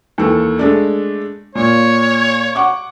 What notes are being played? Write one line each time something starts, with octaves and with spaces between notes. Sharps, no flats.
D#2 E3 A4
G#3 A3 D4
A#2 C#5
F#5 C#6 D6